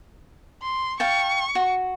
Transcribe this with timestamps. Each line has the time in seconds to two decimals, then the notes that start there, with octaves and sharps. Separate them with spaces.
0.62 C6
1.00 F5 G5 A5 C#6
1.55 F#4